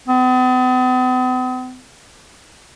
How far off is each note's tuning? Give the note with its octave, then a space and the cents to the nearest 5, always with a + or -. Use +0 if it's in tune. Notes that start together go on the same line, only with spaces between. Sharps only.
B3 +45